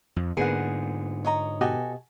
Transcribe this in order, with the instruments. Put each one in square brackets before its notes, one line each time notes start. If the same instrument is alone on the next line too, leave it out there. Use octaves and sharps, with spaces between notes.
[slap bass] F2
[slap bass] G#2 D3 [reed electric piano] A#3 B3 [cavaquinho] G#4 F#5
[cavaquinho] C#5 D#5 A#5
[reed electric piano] B2 G4 D#5 [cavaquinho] F#4 A4 G#5